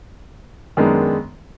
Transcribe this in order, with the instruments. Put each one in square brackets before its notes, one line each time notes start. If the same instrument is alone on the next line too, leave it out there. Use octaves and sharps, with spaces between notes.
[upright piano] F#2 D#3 G#3 B3 D4